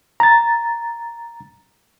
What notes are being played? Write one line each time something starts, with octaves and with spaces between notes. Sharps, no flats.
A#5 A6